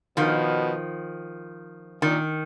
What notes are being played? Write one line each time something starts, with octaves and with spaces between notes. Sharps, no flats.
B2 D#3 F3
A#2 D#3